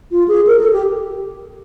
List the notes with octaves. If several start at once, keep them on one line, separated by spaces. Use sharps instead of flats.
F4
G#4
A#4
A4
G4